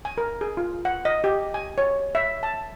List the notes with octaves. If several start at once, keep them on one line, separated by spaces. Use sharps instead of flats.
G#5
A#4
G#4
F4
F#5
D#5
G4
G#5
C#5
E5
A5